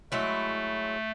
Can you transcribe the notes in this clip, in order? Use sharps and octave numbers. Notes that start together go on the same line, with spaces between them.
F#3 G#3 A3 E4